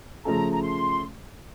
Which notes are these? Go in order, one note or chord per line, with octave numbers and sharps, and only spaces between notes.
C#3 F3 A3 C#4 A4 A#5
A#5
C6